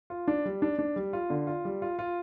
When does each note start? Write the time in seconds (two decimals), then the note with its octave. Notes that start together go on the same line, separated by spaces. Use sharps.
0.10 F4
0.28 D4
0.45 G3
0.62 D4
0.79 D4
0.96 G3
1.13 F4
1.30 D3
1.47 F4
1.65 G3
1.82 F4
1.99 F4